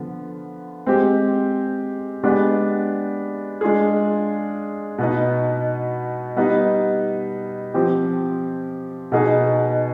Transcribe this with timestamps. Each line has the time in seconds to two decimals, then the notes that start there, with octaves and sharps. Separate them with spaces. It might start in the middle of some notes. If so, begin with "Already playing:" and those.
Already playing: D3 F3 B3
0.86 G#3 C4 G4
2.23 G#3 B3 D4 G4
3.61 G#3 D4 F4 G#4
4.98 B2 B3 D#4
6.36 G3 B3 D#4
7.74 F3 C4 G4
9.12 B2 B3 D#4 G#4